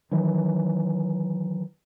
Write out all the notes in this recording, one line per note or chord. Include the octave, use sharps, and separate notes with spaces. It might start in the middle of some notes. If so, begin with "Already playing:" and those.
D#3 E3 F#3